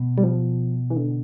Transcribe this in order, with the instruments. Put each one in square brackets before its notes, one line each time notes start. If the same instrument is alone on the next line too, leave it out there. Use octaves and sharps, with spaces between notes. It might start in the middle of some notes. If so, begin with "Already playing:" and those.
Already playing: [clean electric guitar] B2
[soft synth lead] G3
F3
E3
D3